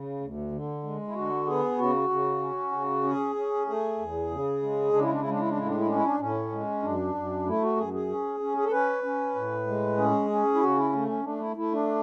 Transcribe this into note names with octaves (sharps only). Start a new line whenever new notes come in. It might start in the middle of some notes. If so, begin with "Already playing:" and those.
Already playing: C#3
D2
D3
G#3
E4
D3 F#4
B3 G#4
C#3 F#4
C#3
C#4
C#3
C#4 G#4
C#4
A3 G#4
E2
C#3
G#3
C#3 D4
E4
D4
E4
G#3
D4
E4
D4
A2 E4
D4
E4
C#4 D4
E4
D4
A2 C#4
G#3
F#2 D4
F#2
A3 E4
F#4
F#2 G#4
G#4
C#4
C#4
G#4
A4
C#4 B4
C#4
A2
G#3
C#4 G#4
C#4
E4
C#3 F#4
E4
A3
C#4
A3 D4
E4
A3 E4
D4